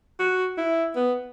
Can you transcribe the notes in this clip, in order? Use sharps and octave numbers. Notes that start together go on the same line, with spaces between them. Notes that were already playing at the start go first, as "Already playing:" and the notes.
F#4
E4
B3